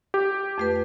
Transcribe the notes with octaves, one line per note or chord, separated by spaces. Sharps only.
G4
F2 A3 B4